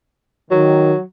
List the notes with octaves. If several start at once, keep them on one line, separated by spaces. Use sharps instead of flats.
D#3 F#3